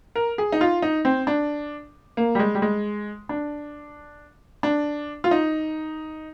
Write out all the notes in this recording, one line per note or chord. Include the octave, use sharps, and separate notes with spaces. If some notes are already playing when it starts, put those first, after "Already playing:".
A#4
G#4
D#4
F4
D#4
C4
D4
A#3
G3
G#3
G3
G#3
D4
D4
F4
D#4